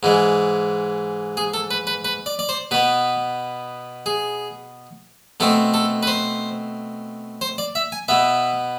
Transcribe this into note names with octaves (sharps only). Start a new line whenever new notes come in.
G#2 E3 G#3
G#4
A4
B4
B4
B4
D5
D5
C5
B2 B3 B4
G#4
B2 A3 C4 A4
A4
B4
C5
C5
D5
E5
G#5
B2 B3 E5